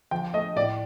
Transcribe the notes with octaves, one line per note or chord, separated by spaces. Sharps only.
F3 G5
A3 D#5
A2 D5